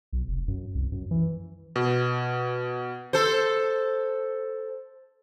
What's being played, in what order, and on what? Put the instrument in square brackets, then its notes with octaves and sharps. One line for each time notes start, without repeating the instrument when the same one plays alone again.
[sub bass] B1
F1
F#2
C2
F#2
E3
[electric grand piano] B2
[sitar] A4 C5